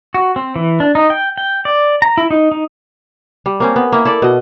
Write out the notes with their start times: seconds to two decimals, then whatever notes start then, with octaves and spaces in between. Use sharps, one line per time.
0.14 F#4
0.36 C4
0.56 E3
0.80 D4
0.95 D#4
1.10 G5
1.37 G5
1.65 D5
2.02 A#5
2.17 E4
2.31 D#4
2.52 D#4
3.46 G3
3.60 A#3 C4 C#4
3.76 B3
3.92 A#3 E4
4.05 E4 A4 D5
4.22 B2 D#5